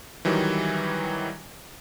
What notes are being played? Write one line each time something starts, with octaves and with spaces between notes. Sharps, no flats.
D#3 E3 F#3 G3